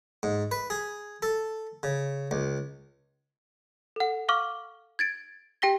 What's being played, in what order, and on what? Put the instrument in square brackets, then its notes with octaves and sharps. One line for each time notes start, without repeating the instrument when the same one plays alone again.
[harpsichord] G#2
B4
G#4
A4
C#3
C#2
[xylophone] A4 F#5
F5 C#6 D6 F6
G#6 A6 D7
G4 G5 A#6 B6 G7